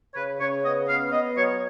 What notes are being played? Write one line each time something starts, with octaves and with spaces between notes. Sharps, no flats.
C#5
C#3 B4
C#3 C#5
B3 D#5
B3 F5
B3 D#5
F#3 C#5